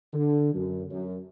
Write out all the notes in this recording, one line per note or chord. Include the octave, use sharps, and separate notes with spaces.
D3
F#2
F#2